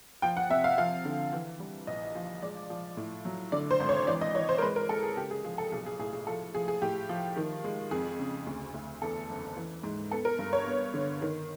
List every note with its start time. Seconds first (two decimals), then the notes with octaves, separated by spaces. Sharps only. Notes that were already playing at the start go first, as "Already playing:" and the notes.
0.22 F3 G5
0.37 F#5
0.50 C3 E5
0.64 F5
0.78 F3 F5
1.05 D3
1.33 E3
1.60 G3
1.87 A#1 D#5
2.15 F3
2.43 G#3 D5
2.70 F3
2.97 A2
3.25 F#3
3.52 D3 D5
3.71 C5
3.80 G#1
3.89 C#5
4.07 E3 D5
4.21 D#5
4.35 E3 C#5
4.49 C5
4.58 A#4
4.62 G#3 B4
4.76 A#4
4.89 G#3 A4
5.03 G#4
5.17 C#3 G4
5.31 G#4
5.45 F3 G#4
5.58 A4
5.72 B1 G#4
5.86 G#4
5.99 A2 G#4
6.13 G#4
6.27 F3 A4
6.55 F3 G#4
6.68 G#4
6.82 A2 G4
7.09 F3
7.36 D#3
7.64 G#3
7.91 F2 G#4
8.19 C#3
8.47 D2
8.74 D2
9.02 E2 A4
9.29 F#1
9.57 E3
9.83 G#2
10.11 B3 A4
10.25 A#4
10.39 G2
10.53 C#5
10.66 B3
10.94 D3
11.22 D#3